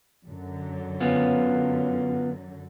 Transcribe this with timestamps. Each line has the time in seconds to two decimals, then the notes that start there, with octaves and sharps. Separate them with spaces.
0.26 F#2 D3 F#3
1.00 B3 C#4 F4